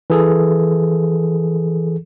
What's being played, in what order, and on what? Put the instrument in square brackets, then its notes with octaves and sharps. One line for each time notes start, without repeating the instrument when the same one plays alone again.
[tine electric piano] E3 G#4 A4